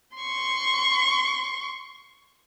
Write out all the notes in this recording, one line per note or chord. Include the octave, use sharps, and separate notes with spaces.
C6 C#6